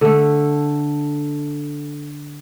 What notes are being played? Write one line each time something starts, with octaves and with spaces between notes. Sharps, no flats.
D3 A3